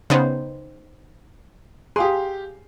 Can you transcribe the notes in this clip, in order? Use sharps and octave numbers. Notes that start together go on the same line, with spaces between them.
C#3 B3 D#4 C5
G4 G#4 F5 C6